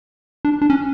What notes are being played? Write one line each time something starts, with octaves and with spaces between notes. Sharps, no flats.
D4
D4
C#4